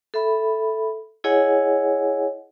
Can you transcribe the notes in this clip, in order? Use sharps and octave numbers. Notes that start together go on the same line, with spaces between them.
A4 E5 B5
E4 G#4 C#5 D#5 F#5 G#5